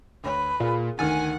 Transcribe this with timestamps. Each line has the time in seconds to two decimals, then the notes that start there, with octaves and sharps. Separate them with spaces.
0.24 D2 B4 C#5
0.60 A#2 F4 G#4 A#4
0.99 D2 D#3 F#5 G#5 F6 A6